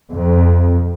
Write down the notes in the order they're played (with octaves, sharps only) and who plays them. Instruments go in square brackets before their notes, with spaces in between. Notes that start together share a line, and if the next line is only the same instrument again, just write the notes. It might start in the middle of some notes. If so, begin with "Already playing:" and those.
[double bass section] F2